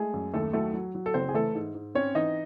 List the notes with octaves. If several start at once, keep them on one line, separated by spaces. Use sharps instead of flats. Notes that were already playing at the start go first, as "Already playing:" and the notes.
Already playing: G#3 A3 G#4
F#2
D#2 A3 A4
F#3 A3 A4
F#3
F#3
A4
F#1 C4 C5
G#4
E3 A3 A4
G#2
G#2
C4 C#4 C#5
E3 D#4 D#5